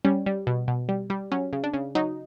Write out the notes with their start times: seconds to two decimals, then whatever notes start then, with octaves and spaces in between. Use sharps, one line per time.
0.05 G3 C#4
0.26 G3
0.47 B2
0.68 B2
0.89 G3
1.10 G3
1.32 F#3 C#4
1.53 C#3
1.64 D4
1.74 C#3
1.95 F#3 D#4